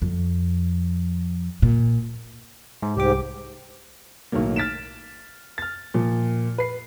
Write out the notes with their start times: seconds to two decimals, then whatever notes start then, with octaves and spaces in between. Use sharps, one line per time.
0.02 F2
1.62 A#2
2.82 G#2
2.97 C2 G#2 G4 D6
4.32 B1 A2 D#3 F#3 A#3
4.56 F6 A6 B6 D7 E7
5.58 F6 A6
5.94 A#2 F3
6.58 B4 C7